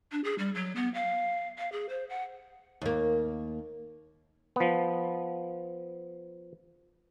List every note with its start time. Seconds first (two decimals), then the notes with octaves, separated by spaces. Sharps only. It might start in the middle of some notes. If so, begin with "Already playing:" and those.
0.12 D4
0.24 G#4
0.39 G3
0.55 F#3
0.76 B3
0.94 F5
1.58 F5
1.72 G#4
1.89 C5
2.09 F#5
2.81 D#2 A#3
4.56 F3 B3